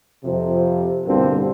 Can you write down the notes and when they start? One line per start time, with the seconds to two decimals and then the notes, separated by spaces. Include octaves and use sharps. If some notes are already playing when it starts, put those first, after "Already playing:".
0.24 F2 C3
1.06 C2 G2 B2 D3 A#3 C4